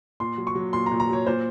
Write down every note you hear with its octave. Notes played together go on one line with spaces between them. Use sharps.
A#2 C6
F#3
C#6
F#3
A#2 C6
A#5
A#2
A#5
F#3 C#5
A#2 C5